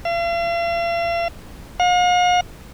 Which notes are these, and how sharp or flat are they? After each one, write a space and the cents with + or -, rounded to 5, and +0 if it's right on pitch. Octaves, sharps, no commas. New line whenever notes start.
F5 -45
F5 +45